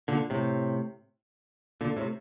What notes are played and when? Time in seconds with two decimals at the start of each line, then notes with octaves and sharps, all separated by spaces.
0.08 A#2 D3
0.30 A2 C3
1.81 A#2 D3
1.97 A2 C3